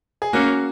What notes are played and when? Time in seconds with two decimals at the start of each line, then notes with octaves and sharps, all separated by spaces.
0.22 G#4
0.33 A#3 C#4 F#4